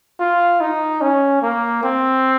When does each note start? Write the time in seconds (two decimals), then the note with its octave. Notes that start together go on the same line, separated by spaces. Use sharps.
0.20 F4
0.61 D#4
1.01 C#4
1.42 A#3
1.83 C4